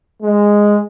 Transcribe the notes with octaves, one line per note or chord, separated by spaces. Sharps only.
G#3